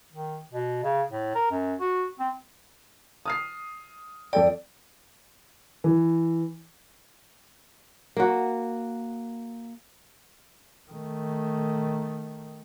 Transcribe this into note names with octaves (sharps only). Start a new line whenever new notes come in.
D#3
B2
C#3
A2
A#4
F#2
F#4
C4
D#6 F6 C7
F2 A4 D5 G5
E3
A#3 F#4
D#3 A3